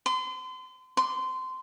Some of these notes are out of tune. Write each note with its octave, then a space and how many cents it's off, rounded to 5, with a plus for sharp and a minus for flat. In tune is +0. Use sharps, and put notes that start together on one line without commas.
C6 -35
C6 -20